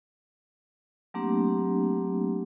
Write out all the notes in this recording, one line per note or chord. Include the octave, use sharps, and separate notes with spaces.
F#3 A3 A#3 C4 D4 G4